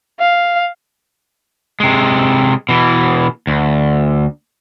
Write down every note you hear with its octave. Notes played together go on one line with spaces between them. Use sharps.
F5
C3 G#3
B2 E3
D2